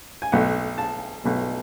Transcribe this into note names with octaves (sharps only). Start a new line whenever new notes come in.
G#5
B1 B2 A3 F#5
A5
B1 B2 A3